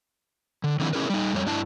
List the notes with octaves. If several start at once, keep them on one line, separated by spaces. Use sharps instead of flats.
D3
D#3 F3 A3 C4 D4 E4
C#4 E4 G#4 A#4 B4
G3 D#4
F2 G3 C#5
G2 D4 E4 A5